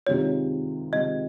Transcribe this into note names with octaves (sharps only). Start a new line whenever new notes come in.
C3 D#3 G#3 C4 F4 C#5
C3 D#3 G#3 C4 F4 D#5